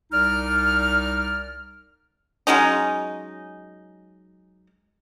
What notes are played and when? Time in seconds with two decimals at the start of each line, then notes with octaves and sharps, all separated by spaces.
0.11 C2 D#4 D5 F6
2.47 F#3 G#3 C#4 D#4